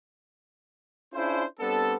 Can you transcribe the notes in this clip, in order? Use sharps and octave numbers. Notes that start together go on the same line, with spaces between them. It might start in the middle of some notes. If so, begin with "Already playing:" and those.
C#4 D4 E4 F4 G#4 C5
G3 B3 C4 D4 A4